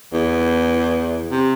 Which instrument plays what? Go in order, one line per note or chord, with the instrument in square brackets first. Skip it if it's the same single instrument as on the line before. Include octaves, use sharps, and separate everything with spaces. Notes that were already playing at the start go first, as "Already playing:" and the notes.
[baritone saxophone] E2
C3